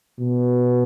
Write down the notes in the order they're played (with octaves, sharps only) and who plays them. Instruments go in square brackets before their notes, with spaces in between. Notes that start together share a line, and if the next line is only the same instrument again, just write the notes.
[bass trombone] B2